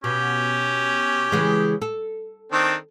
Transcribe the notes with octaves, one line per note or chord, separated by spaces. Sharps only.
B2 C#4 G4
C#3 E3 G#3
A4
D#3 C4 D4